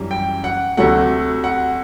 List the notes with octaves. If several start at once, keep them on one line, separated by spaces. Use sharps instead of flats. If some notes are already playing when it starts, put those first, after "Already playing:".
Already playing: F#2 E3 G3
G5
F#5
D2 C3 F#3 A3 F#5
F#5